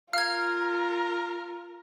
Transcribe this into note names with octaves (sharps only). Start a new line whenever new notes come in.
F4 A#4 F5 F6 G#6